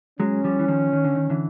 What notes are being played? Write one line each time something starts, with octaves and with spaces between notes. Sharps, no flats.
F#3 G#3 C#4
F3 G3
E3
D#3 F3
D#3
D3
D#3
D3 E3